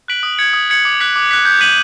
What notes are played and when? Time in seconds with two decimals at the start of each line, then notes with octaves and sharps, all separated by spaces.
0.08 F#6 B6 D7 F#7
0.23 D#6
0.38 G#6 C#7 F#7
0.53 D#6
0.70 G#6 C#7 F#7
0.85 D6
1.00 F#6 B6
1.16 D6
1.31 F#6 B6
1.45 G6
1.61 B6 D#7 F#7